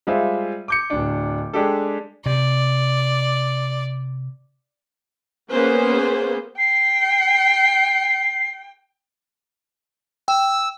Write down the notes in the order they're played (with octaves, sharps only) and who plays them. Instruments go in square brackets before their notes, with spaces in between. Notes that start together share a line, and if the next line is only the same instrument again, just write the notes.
[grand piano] G3 G#3 F4 C5 E5
D6 G6 C#7
D1 D4
G#3 D4 G4 A4
[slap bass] C3 [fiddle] D5
[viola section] A#3 B3 C#4 G#4 B4 C5
[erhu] G5 [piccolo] C7
[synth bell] G5 [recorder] E6